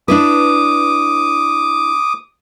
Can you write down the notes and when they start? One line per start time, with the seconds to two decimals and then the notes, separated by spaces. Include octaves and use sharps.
0.08 D4 E4 B4 D6 D#6